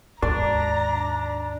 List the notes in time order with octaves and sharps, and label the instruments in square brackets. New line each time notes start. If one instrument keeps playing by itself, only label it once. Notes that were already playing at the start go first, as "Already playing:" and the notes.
[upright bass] D#2 G#2 [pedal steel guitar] D4 [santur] D5 [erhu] A#5